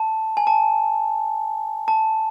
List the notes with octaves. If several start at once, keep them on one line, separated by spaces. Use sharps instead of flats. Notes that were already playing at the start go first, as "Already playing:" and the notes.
Already playing: A5
G#5
A5
A5